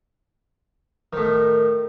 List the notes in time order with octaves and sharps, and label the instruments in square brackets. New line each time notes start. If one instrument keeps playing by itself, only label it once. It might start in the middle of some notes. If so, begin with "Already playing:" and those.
[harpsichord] A2 D#3